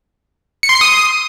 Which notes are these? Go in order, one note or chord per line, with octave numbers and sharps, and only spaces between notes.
C#7
C6
C7
D#6